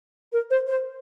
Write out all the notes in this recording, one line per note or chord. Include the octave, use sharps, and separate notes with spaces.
A#4
C5
C5